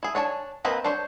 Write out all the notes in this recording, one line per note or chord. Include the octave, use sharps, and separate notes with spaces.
E4 G#4
D4 C#5 G#5 A5
A#3 C4 B4 D#5
D4 C5 C#5